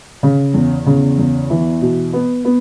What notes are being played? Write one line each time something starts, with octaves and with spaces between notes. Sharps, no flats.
C#3
E2
C#3
E2
E3
B2
B3
B3